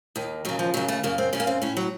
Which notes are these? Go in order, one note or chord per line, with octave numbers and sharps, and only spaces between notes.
D#2 D#3
D#2 C#3 F#3
F3
D#2 C#3 F#3
A3
F#2 C#3 A#3
C4
F#2 C#3 C#4
A#3
C4
A2 C#4
F#3